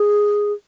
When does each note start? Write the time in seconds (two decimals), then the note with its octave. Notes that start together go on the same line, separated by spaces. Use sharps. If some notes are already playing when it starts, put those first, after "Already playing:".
Already playing: G#4